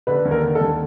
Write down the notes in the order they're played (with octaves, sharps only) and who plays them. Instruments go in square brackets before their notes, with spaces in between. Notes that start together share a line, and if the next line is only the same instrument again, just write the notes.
[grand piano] D3 [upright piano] B4
[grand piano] D#2
[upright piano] A#4
[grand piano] D3
[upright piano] A4
[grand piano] D#2